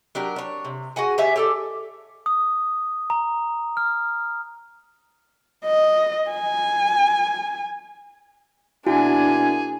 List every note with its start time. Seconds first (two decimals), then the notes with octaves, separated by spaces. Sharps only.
0.15 F#3 D4 G4 A#4
0.36 D4 C#5
0.65 C3
0.96 F#4 G#4 F#5 G#5
1.18 G4 C#5 E5 G#5
1.36 G4 A4 D5
2.26 D#6
3.10 A#5
3.77 F6
5.65 D#5
6.30 G#5
8.87 B2 A#3 D4 E4 F#4 G#4 G#5